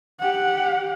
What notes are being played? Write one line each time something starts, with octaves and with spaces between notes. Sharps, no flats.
G4 F#5